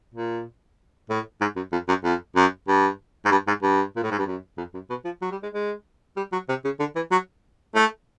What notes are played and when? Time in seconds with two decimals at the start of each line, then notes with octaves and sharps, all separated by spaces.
0.14 A#2
1.10 A2
1.41 G#2
1.56 F#2
1.72 F2
1.88 F#2
2.04 F2
2.36 F#2
2.68 G2
3.25 G#2
3.31 G2
3.47 G#2
3.62 G2
3.96 A#2
4.04 A2
4.11 G#2
4.18 G2
4.27 F#2
4.58 F2
4.74 F#2
4.90 B2
5.05 F3
5.22 F#3
5.31 G3
5.43 G#3
5.53 G#3
6.17 G3
6.32 F#3
6.49 C3
6.65 C#3
6.80 D3
6.96 E3
7.12 F#3
7.75 A3